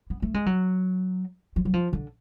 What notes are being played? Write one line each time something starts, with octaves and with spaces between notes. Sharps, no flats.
B3
A3
G#3
F#3
F3
F#3
F3
D3